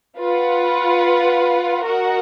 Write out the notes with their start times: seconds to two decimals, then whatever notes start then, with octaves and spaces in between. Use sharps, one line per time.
0.17 F4 B4 F#5
1.85 F#4 A#4 D#5 F#5